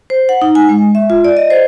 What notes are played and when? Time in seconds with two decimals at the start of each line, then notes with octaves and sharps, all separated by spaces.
0.10 C5
0.29 F#5
0.42 D#4
0.55 G#5
0.69 G#3
0.95 E5
1.10 F4
1.24 D5
1.37 D#5
1.50 C5